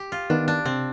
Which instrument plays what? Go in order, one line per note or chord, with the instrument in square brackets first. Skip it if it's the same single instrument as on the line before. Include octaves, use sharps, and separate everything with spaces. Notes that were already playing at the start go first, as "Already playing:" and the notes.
Already playing: [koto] G4
F4
[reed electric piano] D#3 B3 [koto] D4
[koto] D4
[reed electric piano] C3 [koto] C4